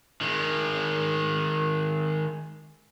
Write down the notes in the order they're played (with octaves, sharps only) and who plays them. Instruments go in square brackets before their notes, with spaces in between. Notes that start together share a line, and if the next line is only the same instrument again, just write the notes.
[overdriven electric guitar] D#3 G#3